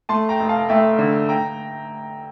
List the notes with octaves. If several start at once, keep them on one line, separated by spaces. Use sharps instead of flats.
A3 A5 C6
G5 A#5
F1
F5 A5
A3 E5 G5
D3
G5 A#5